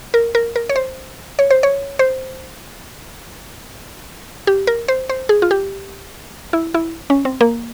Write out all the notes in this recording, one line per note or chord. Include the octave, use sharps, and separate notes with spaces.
A#4
A#4
A#4
C#5
C5
C#5
C5
C#5
C5
G4
A#4
C5
C5
G#4
F4
G4
E4
E4
C#4
C4
A#3